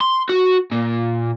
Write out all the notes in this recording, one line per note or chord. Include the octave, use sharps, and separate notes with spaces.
C6
F#4
A#2